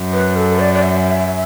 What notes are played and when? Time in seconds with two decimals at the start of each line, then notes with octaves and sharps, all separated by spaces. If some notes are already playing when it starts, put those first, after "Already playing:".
Already playing: F#2
0.13 B4
0.36 A4
0.59 D5
0.75 D5
0.83 E5